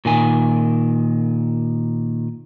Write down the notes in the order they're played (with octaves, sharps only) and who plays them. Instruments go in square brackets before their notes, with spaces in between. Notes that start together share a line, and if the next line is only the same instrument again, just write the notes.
[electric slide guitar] A#2 D#3 G#5